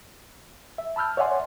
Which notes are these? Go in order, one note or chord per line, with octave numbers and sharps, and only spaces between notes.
E5
A5 B5 E6 F6 G6
C#5 D5 E5 F#5 G#5 C6